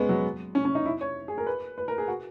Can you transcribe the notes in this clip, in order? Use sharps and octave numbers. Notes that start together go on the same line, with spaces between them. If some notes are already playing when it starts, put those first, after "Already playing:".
Already playing: G#3 B3 C#4
F#3
C#4
C#4
D#4
E4
C#5
G#4
A#4
B4
B4
A#4
G#4
F#4